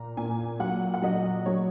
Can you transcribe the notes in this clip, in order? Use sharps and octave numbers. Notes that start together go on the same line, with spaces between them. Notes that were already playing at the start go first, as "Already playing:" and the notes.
Already playing: A#2 A#5
A#2 G#5
F#3 F#5
F#5
F#3 D#5
F#3 C#5